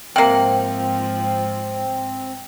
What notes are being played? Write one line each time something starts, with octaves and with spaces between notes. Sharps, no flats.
G#2 C3 F3 A#3 C4 G5